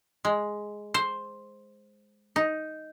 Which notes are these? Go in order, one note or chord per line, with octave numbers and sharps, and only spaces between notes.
G#3
C5
D#4